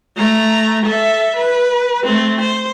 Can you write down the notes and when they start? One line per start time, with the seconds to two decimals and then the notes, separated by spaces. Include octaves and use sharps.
0.17 A3 A#5
0.86 A4 E5
1.36 B4
2.04 A3 C4
2.41 C5